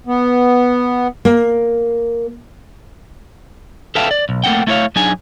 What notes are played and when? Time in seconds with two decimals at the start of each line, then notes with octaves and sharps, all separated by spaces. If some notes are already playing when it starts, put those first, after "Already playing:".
0.07 B3
1.25 A#3
3.95 A4 B4 E5 F5 G5 A5
4.11 D5
4.29 B1
4.44 A3 A#3 D4 F#5 G5
4.67 A3 E4 A#4 C#5 F5
4.96 F#3 D4 D#4 G#4 G#5